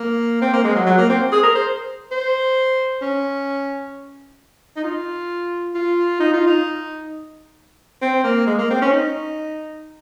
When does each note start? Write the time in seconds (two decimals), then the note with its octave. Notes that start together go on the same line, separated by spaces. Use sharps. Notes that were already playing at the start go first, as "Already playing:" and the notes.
Already playing: A#3
0.41 C4
0.53 A#3
0.64 G#3
0.76 F#3
0.86 F#3
0.98 A#3
1.09 C4
1.32 G#4
1.43 A#4
1.55 C5
2.11 C5
3.02 C#4
4.76 D#4
4.84 F4
5.74 F4
6.20 D#4
6.33 F4
6.47 D#4
8.02 C4
8.24 A#3
8.47 G#3
8.58 A#3
8.70 C4
8.82 C#4
8.92 D#4